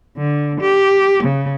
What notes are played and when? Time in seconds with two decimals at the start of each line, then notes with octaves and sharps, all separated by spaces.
0.17 D3
0.61 G4
1.24 C#3